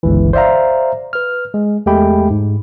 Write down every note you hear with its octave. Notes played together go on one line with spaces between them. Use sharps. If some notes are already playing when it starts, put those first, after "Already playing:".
G1 C#2 E3
C5 D5 E5 F5 A#5
B4 F6
G#3
E2 G#3 A3 G4 G5 B5
G#2